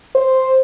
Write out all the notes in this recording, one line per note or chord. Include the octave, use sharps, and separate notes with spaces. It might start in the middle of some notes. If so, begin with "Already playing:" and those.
C5